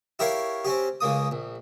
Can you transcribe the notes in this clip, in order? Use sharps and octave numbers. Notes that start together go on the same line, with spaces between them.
E4 G4 A#4 C#5 F5
C4 C#4 G4
C#2 C#3 A#3 D#6
A#1